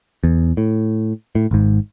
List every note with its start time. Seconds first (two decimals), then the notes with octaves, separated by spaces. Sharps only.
0.24 E2
0.57 A2
1.35 A2
1.51 G#1 G#2